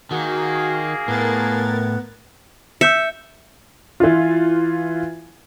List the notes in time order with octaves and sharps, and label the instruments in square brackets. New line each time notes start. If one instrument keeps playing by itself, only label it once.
[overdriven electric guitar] D#3 [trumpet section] A#3 G#4 [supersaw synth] F#4
[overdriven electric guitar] A2 [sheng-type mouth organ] B3 [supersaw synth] A#4 G#6 A6
[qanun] E5 [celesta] E6 G6 C#7
[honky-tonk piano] E3 F4